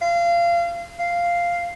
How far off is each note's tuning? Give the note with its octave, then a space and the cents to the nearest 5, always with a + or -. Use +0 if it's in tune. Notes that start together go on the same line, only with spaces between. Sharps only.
F5 -25
F5 -5